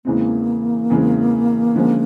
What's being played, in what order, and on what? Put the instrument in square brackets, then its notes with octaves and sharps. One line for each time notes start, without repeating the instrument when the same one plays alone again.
[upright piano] E2 C#3 E3 G#3 C4 [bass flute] A#3
[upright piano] E2 C#3 E3 G#3 C4
D3 F3 G#3 C#4